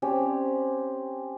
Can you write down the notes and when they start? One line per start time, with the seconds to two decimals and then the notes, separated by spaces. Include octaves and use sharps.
0.02 C4 C#4 G4